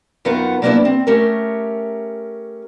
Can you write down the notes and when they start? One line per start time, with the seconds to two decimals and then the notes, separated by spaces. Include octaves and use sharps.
0.25 F#2 D#3 B3 F4 F#5 A#5
0.62 F#3 G3 A#3 B3 D4 E4
0.85 C4
1.07 A3 C#4 G4 A#4